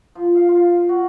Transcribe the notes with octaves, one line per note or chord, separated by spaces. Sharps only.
F3
F5
F4
F#4